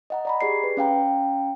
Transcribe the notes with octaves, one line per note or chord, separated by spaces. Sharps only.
D#5 F#5 A#5
D5 A#5 B5
G4 G#4 D5 C7
B4
C#4 F5 G5 A#5